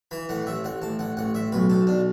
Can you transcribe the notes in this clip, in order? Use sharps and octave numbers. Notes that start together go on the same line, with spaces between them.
E3 B5
A2 F#5
A1 E5
A1 F#5
A1 A5
A1 F#5
A1 F#5
A1 E5
B1 B4
B1 A4
B1 D4